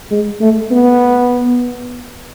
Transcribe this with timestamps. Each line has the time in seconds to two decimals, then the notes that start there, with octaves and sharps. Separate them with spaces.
0.11 G#3
0.41 A3
0.71 B3